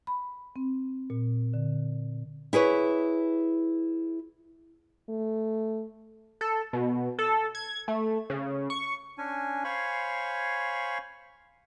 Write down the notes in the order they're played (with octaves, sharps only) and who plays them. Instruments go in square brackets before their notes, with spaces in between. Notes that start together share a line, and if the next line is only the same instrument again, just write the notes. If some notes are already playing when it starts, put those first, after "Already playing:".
[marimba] B5
C4
A#2
D3
[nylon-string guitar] E4 G#4 B4 C#5
[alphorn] A3
[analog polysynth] A4
B2
A4
G#6
A3
C#3
C#6
[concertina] C#4 D4 G#5
C5 C#5 F5 G#5 B5 C#6